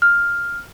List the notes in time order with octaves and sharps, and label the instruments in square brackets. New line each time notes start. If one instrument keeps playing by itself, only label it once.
[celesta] F6